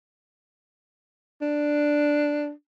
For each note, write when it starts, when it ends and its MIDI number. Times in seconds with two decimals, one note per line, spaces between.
1.42 2.51 62